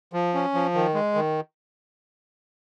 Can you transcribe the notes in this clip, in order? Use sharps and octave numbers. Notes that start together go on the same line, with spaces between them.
F3
C#4
F3
D#3
G#3
D#3